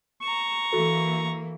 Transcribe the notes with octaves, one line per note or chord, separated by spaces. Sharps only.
A#5 C#6 E7
E3 A#3 F#4 A4